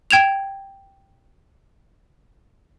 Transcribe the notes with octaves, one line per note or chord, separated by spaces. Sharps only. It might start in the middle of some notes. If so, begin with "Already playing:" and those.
G5 G#6 E7 F7